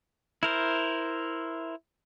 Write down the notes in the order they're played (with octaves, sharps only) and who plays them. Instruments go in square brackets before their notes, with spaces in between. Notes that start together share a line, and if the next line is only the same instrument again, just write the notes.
[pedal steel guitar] E4 A#4 C5